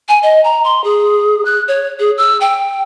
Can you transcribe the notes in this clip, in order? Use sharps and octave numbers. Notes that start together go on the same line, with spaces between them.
G#5
D#5
A#5
C6
G#4
F#6
C#5
G#4
E6
G5